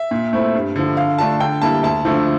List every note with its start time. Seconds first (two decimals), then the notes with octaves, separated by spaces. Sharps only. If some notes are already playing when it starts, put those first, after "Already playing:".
Already playing: E5
0.11 A#2
0.33 A3 C4 E4
0.54 G2
0.76 D3 F3
0.97 D3 F5
1.18 A3 D4 F4 A5
1.40 D3 G5
1.62 G3 A#3 E4 A5
1.83 D2 A5
2.05 D3 F3 A3